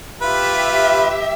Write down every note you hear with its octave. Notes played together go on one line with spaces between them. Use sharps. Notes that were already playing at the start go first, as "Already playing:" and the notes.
F4 G4 B4 E5